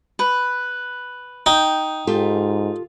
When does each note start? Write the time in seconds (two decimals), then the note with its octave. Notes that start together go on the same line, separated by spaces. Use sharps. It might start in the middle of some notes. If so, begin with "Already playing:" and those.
0.19 B4
1.46 D#4 G5
2.07 G#2 F4 G4 A4